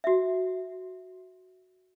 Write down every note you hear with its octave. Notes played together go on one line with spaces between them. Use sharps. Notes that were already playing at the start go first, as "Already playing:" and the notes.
F#4 E5